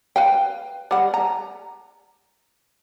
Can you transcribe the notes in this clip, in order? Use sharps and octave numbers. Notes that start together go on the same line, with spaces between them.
B4 F5 G5
G3 F#5
A#5